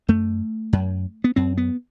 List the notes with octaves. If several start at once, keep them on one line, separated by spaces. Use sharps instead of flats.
F#2 A3
F#2
B3
F#2 C4
B3